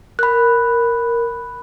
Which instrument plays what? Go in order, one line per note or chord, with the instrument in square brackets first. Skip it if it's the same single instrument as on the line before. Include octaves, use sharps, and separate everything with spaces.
[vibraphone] A#4 [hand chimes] B5 F#6